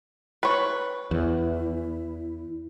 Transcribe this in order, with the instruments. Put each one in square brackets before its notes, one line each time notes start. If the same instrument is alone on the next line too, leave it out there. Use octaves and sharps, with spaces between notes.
[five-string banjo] B4 C#5
[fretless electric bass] E2 [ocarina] E4